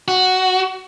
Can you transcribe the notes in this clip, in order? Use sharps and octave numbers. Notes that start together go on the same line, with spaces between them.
F#4